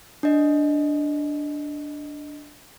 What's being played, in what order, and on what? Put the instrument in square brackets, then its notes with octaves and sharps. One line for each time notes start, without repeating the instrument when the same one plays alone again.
[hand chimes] D4 D#5